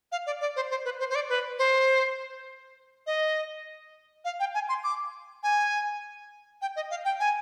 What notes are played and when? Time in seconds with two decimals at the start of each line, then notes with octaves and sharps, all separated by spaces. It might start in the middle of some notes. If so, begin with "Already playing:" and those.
0.12 F5
0.26 D5
0.41 D5
0.56 C5
0.71 C5
0.85 B4
0.99 C5
1.10 C5
1.15 D5
1.29 B4
1.58 C5
3.07 D#5
4.25 F5
4.40 G5
4.54 G#5
4.69 C6
4.84 D6
5.43 G#5
6.62 G5
6.76 D#5
6.90 F5
7.05 G5
7.20 G#5